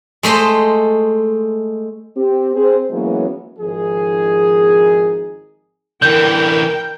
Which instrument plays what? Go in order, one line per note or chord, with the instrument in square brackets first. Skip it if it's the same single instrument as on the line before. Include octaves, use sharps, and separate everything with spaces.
[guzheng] G#3 A3 C5 D#5
[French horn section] C4 G4
C4 G#4 C5
E3 F#3 G#3 A#3 B3 C#4
[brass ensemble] G#1 F3 D#4 G#4
[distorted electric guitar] D3 E3 [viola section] A#4 G5 [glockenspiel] G6